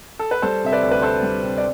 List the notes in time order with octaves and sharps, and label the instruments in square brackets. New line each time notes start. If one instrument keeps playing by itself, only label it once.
[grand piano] A4
B4
G3 A4 C5
C3 E5
B4 D5
D2
B4
D4 A4 C5
G3
C3
D5